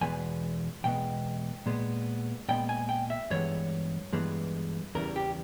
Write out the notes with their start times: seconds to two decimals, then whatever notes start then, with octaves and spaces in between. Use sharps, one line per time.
0.01 E2 B2 G#3 B3 G#5
0.84 E2 B2 G#3 B3 G5
1.66 A#2 G#3 B3
2.48 A#2 G#3 B3 G5
2.69 G#5
2.89 G5
3.10 E5
3.30 G2 E3 G#3 B3 C#5
4.13 G2 E3 G#3 B3
4.95 E2 C#3 E3 G3 A#4
5.16 G4